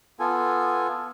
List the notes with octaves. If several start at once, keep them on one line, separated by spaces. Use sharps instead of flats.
B3 F4 A4 G#5